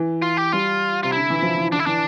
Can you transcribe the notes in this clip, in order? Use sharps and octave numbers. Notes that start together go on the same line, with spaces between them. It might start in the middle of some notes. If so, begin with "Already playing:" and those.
Already playing: E3
F4
G4
G3 F4
C3 F4
D3 E4
E3
F3
E3
D3 D4
E4
E3 D4